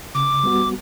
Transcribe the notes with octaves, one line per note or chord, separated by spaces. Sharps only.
C#3 D6
G3 B3 F#4